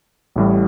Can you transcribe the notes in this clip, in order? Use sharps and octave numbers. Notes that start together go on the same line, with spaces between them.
A1 A2 G3